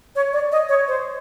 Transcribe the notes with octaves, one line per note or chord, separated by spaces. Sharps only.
C#5
D5
D#5
C#5
C5